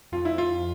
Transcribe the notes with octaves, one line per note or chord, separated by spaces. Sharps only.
F2 F4
E4
F4